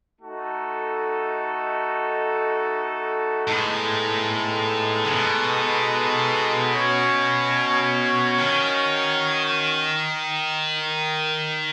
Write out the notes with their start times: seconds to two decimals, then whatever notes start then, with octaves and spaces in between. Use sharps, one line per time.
0.20 A3 D#4 F#4 A4
3.47 A2 G#3 B3 D#4 A4
5.05 C#3
5.11 B2
6.74 C#4 F#4 C#5
8.39 D#3